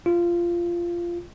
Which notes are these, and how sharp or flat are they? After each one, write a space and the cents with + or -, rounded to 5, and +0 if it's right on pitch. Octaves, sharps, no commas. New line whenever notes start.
F4 -15